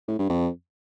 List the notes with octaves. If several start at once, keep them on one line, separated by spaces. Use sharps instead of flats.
A2
G2
F2